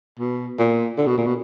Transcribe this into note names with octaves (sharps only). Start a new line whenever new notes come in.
B2
A#2
D3
B2
A#2
B2